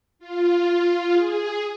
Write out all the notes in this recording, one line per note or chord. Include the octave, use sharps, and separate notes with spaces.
F4
G#4